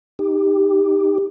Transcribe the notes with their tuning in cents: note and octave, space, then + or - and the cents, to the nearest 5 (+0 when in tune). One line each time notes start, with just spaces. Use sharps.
D#4 +0 G4 +15